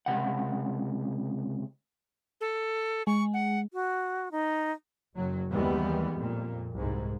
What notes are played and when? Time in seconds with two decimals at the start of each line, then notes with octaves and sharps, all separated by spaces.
0.06 C#2 G#2 C3 F#5
2.41 A4
3.07 G#3 C#6
3.34 F#5
3.73 F#4
4.32 D#4
5.14 F#1 F#3
5.50 D#2 E3 G3 G#3 B3
6.13 F2 A#2
6.77 C2 G#2